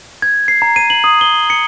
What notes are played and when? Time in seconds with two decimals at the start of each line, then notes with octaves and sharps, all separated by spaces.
0.22 G#6
0.48 C7
0.62 A#5
0.76 D#7
0.90 F#7
1.04 D#6
1.21 G7
1.50 C#7